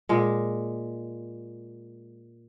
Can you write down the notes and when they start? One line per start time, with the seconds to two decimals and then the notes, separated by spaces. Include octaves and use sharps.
0.09 A#2 G#3